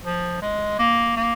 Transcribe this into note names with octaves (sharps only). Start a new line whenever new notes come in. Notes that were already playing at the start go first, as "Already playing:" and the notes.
F3
G#3
A#3
A#3